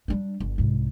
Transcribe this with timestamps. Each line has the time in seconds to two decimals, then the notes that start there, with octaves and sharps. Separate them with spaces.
0.08 G3 D4
0.40 G1
0.58 C2 G#2